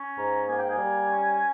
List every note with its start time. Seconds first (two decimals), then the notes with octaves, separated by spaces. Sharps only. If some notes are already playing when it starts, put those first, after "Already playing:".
Already playing: C#4
0.17 G#2 A#5
0.48 A#3 G#5
0.59 G5
0.69 G#5
0.78 G3
1.08 C#4